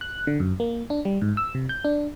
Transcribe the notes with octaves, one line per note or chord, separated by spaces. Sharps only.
F#6
D3
F#2
A#3
D4
G3
G#2
E6
C3
G6
D4